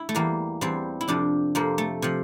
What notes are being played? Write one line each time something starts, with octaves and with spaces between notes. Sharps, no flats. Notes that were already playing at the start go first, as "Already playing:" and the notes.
Already playing: E4
A3
E2 E3 G3 A#3
E2 E3 G3 C4
E4
F2 C3 F3 D4
F2 C3 F3 A#3
A3
C3 F3